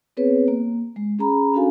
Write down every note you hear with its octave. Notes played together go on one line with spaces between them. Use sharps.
B3 C4 G#4 B4 C#5
A#3
G#3
C#4 G#4 A#5 B5
C#4 D4 F#4 A4 F5 G#5